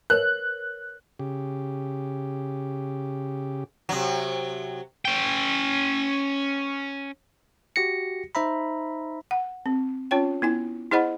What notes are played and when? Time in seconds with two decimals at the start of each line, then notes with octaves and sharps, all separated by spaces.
0.10 A#4 B4 C#5 F#6
1.19 C#3 G4
3.89 C3 F#3
5.05 C#4 G5
7.76 F#4 G4 A#6 C#7
8.35 D#4 C5 E5 A#5 B5
9.31 F#5
9.66 C4
10.11 C#4 F4 C#5 G5
10.42 B3 E4 G#5
10.92 E4 G#4 C5 D#5 F#5 B5